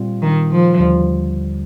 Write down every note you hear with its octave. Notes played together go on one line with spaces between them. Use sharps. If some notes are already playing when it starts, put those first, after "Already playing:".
Already playing: A#2 G3 C4 F4
D#3
F3
D#2 D3 G3